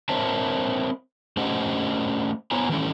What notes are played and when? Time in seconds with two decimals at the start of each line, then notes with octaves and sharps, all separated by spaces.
0.09 C4 A#4 C5 C#5 E5 A5
1.37 A3 C#4 G4 C5 D#5 F#5
2.51 B3 E4 C5 C#5 G#5 A#5
2.69 D#3 E3 G3 A3 C#4 E4